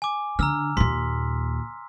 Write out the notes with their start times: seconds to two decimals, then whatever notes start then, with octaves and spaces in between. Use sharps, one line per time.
0.02 G#5 D6
0.39 D3 A#5 E6 F6
0.77 D#2 A#2 C6 B6